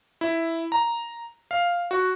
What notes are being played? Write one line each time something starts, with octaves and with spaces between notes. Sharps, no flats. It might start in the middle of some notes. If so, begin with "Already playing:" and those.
E4
A#5
F5
F#4